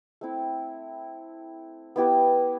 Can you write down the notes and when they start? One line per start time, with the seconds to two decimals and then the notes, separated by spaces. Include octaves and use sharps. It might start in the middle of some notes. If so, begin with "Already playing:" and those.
0.21 A3 C4 E4
1.96 B3 E4 G4 B4